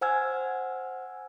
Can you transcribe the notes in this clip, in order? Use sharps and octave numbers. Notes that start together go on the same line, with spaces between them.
C5 F#5 G#5 E6 F6 G#6